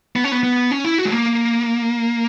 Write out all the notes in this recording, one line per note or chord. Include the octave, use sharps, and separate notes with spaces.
B3
C#4
B3
B3
C#4
E4
F#4
G#3
A#3